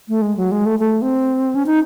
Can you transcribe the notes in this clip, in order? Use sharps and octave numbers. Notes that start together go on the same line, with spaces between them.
A3
G#3
F#3
G#3
A3
A3
C4
C#4
D#4